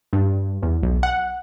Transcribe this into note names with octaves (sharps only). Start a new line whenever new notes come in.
G2
E2
B1
F#5